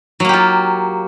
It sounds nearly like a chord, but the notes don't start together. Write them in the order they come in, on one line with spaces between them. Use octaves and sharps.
F#3 A#3 G4 F4